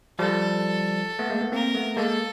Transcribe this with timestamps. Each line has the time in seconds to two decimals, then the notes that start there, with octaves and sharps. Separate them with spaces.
0.19 F3 G3 A4
1.19 A3 B3
1.30 G#3 A#3
1.41 A3 B3
1.52 A#3 C4 A#4
1.75 A3 B3
1.96 G#3 A#3 A4